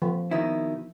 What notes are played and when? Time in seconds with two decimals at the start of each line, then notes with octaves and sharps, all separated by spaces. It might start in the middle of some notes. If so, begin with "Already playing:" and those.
0.02 F3
0.31 B2 D#3 E4